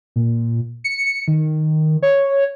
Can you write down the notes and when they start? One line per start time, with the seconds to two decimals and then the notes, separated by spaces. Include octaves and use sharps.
0.16 A#2
0.84 C#7
1.28 D#3
2.03 C#5